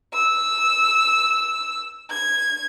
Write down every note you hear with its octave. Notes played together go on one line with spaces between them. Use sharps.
E6
G#6